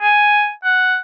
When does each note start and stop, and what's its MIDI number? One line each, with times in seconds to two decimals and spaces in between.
0.02 0.51 80
0.64 0.98 78